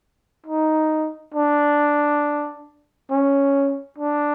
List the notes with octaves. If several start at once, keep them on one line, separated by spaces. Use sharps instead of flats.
D#4
D4
C#4
D4